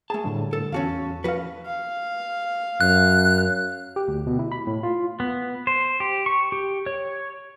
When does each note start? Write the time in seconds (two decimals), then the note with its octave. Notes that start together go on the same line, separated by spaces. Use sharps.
0.10 A3 G#4 A5
0.24 A2 D3 G3
0.53 A4
0.72 E2 C#4 F#4 F5 A5
1.24 F3 F#4 B4 F5
1.66 F5
2.81 F#2 F#6
3.96 G4
4.08 D2
4.27 B2
4.39 E4
4.52 B5
4.67 A2
4.83 F4
5.20 B3
5.67 C5
6.00 G4
6.26 C#6
6.52 G4
6.86 C#5